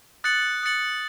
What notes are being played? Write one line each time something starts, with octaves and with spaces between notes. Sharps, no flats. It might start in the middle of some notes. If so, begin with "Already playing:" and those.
D#6 F#6 A6 C#7 F#7
D#6 F#6 A6 C#7 F#7